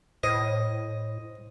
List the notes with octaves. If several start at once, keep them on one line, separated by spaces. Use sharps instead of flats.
A2 C5 D#5